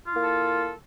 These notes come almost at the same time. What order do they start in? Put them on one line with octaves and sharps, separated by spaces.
F4 E4 A#3 A4